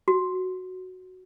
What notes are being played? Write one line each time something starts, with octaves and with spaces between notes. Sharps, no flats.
F#4